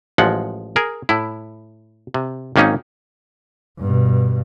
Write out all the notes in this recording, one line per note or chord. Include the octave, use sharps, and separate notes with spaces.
A1 F3 G#3 F#5
G#4 A#4
A2 E4
C3
G#1 D#3 A#3 C#4 D#4
G2 B2